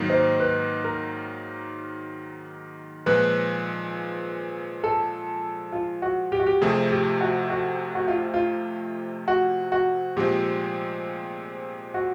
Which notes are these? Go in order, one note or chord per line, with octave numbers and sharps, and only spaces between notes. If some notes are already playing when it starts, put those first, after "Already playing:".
Already playing: G#2 D#3 F#3 A#3 D#4
C5
B4
A#4
A#2 F3 G#3 B4
A4
F4
F#4
G4
F#4
G4
F2 C3 F3 A3 C4 G#4
G4
F#4
F#4
F#4
F4
F4
F#4
F#4
A#2 F3 G#3 C4 G4
F#4